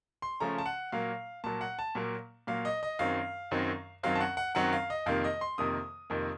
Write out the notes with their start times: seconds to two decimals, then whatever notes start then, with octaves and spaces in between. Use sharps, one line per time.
0.22 C6
0.40 C#3 F3 A3 C#4 A#5
0.58 A5
0.66 F#5
0.92 A#2 F#3 A#3 F5
1.44 A#2 F#3 A#3 A5
1.61 F#5
1.79 A5
1.95 A#2 F#3 A#3
2.47 A#2 F#3 A#3 F5
2.65 D#5
2.83 D#5
2.99 F#2 D#3 F#3 C4 F5
3.51 F#2 D#3 F#3 C4
4.03 F#2 D#3 F#3 C4 F5
4.15 A5
4.21 F#5
4.37 F#5
4.55 F#2 D#3 F#3 C4 F#5
4.73 F5
4.90 D#5
5.06 F2 C3 D#3 A#3 F5
5.24 D#5
5.41 C6
5.58 F2 C3 D#3 A#3 D#6
6.10 F2 C3 D#3 A#3